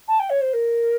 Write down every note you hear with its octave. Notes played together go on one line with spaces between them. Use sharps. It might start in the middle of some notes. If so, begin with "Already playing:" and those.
A5
G5
C#5
C5
A#4